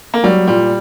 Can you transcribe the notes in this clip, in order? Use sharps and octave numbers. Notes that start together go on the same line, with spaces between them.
A#3
F#3 G3
A#2 G3